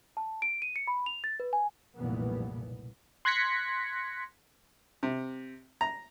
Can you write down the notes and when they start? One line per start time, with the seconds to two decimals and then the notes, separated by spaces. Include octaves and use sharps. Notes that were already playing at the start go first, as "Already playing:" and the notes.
0.17 A5
0.42 D7
0.62 D#7
0.76 C#7
0.87 B5
1.06 F7
1.24 A6
1.40 B4
1.53 G#5
1.96 F1 B1 G2 A#2 E3 B3
3.25 C6 F#6 G#6 A#6 B6 C#7
5.03 C3
5.81 A#5